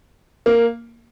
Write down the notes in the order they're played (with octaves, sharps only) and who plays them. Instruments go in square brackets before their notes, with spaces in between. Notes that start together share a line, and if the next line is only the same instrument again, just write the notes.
[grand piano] A#3